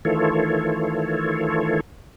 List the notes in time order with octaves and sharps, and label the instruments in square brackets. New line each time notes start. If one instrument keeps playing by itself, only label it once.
[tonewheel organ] D#3 E3 A3 F4 A4 C#5